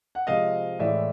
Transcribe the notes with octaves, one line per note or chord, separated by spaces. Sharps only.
F#5
C3 F3 G#3 D#5 F5
A2 E3 G#3 D5 E5